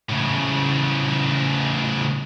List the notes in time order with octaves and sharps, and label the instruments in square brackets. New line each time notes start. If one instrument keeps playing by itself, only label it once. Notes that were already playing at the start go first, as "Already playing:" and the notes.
[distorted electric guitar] A2 C#3